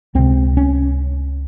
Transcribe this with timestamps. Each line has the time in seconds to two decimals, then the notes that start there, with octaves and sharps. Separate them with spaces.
0.15 C#2 C3 C4
0.57 C#4